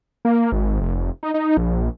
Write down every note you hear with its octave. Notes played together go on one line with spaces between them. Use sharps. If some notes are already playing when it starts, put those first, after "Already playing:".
A#3
G#1
F1
D#4
D#4
A#1